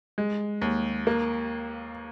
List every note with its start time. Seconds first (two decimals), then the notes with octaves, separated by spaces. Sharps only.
0.18 G#3
0.62 D#2
1.07 A#3